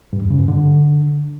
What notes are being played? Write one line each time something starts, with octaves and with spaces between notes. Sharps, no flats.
G2
E2
C#3
G2
D3